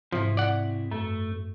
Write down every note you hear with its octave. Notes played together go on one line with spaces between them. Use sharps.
G#2 C3 F3 E4
D5 F#5
F#2 A3